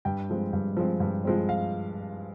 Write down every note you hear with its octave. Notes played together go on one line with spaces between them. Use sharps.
G2 G5
F3 G#3 C4
G2
F3 G#3 C4
G2
F3 G#3 C4
F5